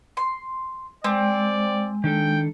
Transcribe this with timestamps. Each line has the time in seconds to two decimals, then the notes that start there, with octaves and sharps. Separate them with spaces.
0.17 C6
1.04 G#3 C4 D5
2.04 D#3 D4 A4 G5